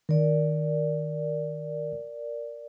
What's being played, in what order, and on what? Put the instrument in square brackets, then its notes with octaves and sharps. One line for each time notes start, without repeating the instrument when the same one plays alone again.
[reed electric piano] D#3 [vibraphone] A#4 D5